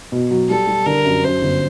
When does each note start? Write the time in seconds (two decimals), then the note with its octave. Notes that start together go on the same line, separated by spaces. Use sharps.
0.12 B2
0.31 F#3
0.49 G3 A4
0.67 G3
0.86 D3 A#4
1.05 F#2
1.24 F#2 C5
1.42 G1